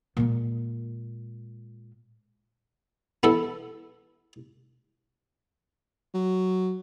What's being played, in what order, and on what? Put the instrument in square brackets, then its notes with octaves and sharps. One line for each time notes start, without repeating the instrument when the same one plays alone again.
[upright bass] A#2 G#3
[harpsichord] B3 E4 A4
[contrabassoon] F#3